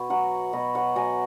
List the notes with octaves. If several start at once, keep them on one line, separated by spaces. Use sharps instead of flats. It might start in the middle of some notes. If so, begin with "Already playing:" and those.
Already playing: B2 F#4 B4
F#3 C#5 F#5
B2 B4 D#5
C#5 F#5
F#3 D#5 G#5